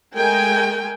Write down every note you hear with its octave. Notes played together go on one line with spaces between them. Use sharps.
G#3 A3 A#4 G5 G#5